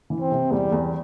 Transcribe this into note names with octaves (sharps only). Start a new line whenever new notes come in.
E3
C4
C3
E2 G3
E2